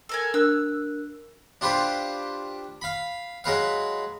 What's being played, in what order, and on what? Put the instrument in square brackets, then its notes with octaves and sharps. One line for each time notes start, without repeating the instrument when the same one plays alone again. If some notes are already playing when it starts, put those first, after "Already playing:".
[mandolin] A4 A#4 G#5
[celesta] D4 A#4 F#6 [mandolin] E6
[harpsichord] D4 F4 G4 B4 C5
F5 B5
F#3 G#3 B4 F5